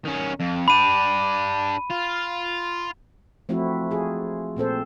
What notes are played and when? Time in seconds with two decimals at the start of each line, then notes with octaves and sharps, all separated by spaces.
0.05 D#3 C#4
0.40 F2
0.68 D4 G4 B5 D#7
1.91 F4
3.49 F3 A3 C4 E4 F#4
3.91 F4 G#4
4.56 A#2 C4 A4 C5